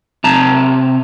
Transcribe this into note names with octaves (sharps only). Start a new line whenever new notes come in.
C3 A5 A#5